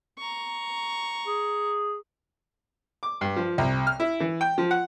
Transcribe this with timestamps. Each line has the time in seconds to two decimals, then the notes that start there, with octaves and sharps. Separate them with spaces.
0.18 A#5 C#6
1.27 G#4
3.03 D6
3.21 G2
3.36 F3
3.58 C2
3.87 F6
4.00 E4
4.20 E3
4.41 G5
4.58 F3
4.71 F#5